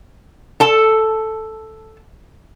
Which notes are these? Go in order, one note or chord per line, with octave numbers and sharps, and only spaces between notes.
A4 A5